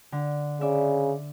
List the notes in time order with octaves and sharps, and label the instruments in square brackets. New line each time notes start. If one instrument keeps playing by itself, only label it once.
[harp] D3
[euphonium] C#3 [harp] D5 E5